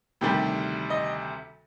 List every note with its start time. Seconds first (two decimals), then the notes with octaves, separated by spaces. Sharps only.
0.21 D2 C3 D#3 G3 G4
0.90 D#5